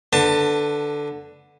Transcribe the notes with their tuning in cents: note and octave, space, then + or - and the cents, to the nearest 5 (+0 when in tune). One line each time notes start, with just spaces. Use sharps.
D3 +0 B4 +0 A5 +25